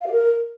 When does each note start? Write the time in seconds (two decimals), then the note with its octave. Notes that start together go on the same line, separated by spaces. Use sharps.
0.02 F5
0.07 G4
0.12 A#4